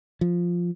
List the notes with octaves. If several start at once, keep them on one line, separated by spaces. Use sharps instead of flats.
F3